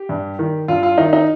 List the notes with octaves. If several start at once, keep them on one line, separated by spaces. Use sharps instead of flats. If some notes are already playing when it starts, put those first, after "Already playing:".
Already playing: G4
G2
D#3
G2 F4
F4
D#3 D#4
D#4